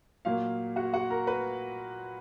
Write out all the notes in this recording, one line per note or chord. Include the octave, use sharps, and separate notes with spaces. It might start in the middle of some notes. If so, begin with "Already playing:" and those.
A#2 F#3 A#3 F5
F#4 F#5
F#4 F#5
A#4 A#5
B4 B5